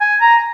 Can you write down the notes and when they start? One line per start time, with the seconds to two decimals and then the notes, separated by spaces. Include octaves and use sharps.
0.01 G#5
0.21 A#5